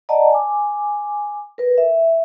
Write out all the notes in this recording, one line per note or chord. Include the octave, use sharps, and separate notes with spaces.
D5 D#5 F#5 A5 A#5
G#5 D6
A#4 B4
E5